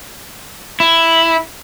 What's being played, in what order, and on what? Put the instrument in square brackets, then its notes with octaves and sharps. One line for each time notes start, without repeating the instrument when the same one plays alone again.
[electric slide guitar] E4